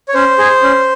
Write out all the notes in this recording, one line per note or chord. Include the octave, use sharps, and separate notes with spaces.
C#5
C#4 C5
G#4
C#4